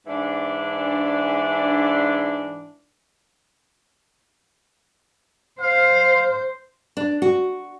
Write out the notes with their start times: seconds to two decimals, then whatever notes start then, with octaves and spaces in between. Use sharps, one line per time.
0.07 G#2 E3 D4
5.61 C5 F5
6.97 D4
7.22 F#4